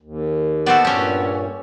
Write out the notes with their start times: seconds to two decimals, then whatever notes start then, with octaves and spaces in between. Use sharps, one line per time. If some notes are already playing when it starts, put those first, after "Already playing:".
0.02 D#2
0.66 B3 F#4 A4 C5 D5
0.85 G2 A#2 C#4 G4